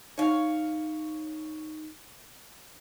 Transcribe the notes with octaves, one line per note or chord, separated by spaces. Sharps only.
D#4 C#5 F5